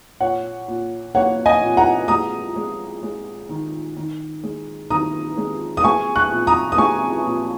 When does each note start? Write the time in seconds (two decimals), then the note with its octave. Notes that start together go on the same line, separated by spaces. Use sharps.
0.20 A#2 C#5 F#5
0.68 A#2
1.15 A#3 C#5 F#5
1.46 D#5 G#5
1.62 A#2
1.77 F#5 A#5
2.08 G#3 A#5 D#6
2.56 G#3
3.03 G#3
3.49 D#3
3.96 D#3
4.44 G#3
4.90 D#3 A#5 D#6
5.38 G#3
5.77 D#6
5.84 G#3 G#5 C#6
6.16 C#6 F#6
6.32 A#2
6.47 A#5 D#6
6.72 D#6
6.78 G#3 G#5 C#6
7.25 A#2